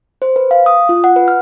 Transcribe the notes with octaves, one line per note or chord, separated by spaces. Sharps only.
C5
B4
F5
D#6
F4
F#5
B4
F6